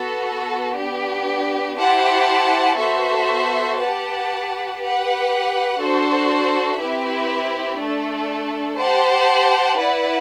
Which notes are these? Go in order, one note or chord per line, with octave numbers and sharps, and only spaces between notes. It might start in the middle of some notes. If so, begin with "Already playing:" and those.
Already playing: B3 F#4 A4
B3 D4 G4
E4 G4 C5 F#5 A5
B3 F#4 A4 C5 E5
G4 B4 F#5 A5
G4 B4 F#5
D4 F#4 A4 C5
C4 E4 G4 B4 E5
A3 D4 A4
G4 C5 F#5 A5
E4 B4 D5 F#5